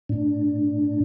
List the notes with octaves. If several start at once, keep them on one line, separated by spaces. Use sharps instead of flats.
A2 D4